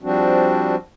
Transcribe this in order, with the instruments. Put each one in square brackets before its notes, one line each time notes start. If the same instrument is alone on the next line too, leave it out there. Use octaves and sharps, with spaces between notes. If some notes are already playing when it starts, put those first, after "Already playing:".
[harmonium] F3 G3 C4 D4 F#4